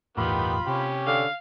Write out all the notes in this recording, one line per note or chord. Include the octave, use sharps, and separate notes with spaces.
G1 E2 A2 D#3 B3 F4 G4 B5
C3 C#4 G4
D3 F5